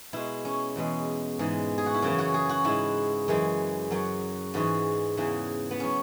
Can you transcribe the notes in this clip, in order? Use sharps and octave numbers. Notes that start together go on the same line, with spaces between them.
B2 G#3 E4
C#4
E2 B2 G#3
G#2 E3 G#3
G#4
F#4
E4
F#2 C#3 E3 C#4
F#4
G#4
F#4
G#2 G#3 E4
F#2 E3 G#3
F#2 F#3
G#2 E3 G#3 F#4
E2 C#3 E3
B3
F#3 C#4